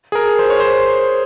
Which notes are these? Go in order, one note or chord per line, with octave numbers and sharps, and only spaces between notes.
G#4
A#4
C5
C#5
C5